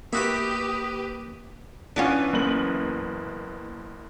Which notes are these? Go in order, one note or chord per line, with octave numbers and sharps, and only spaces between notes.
A#3 E4 F#4 G4 B4 B5 D#6
E3 B3 C#4 D4 F4
F#1 A#3 F#7